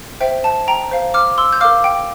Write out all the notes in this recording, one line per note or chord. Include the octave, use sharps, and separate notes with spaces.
C5 E5 G5
A5
G5 A#5
C5 F5
D6 F6
C6 E6
G6
A#4 F5 D6 F6
G5